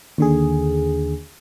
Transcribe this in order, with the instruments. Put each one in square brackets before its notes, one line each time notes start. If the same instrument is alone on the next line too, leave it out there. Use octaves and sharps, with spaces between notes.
[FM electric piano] D#2 D3 G#4